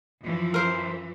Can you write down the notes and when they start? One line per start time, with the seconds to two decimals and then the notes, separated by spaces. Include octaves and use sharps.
0.22 F#2 E3 F3
0.54 A#4 C5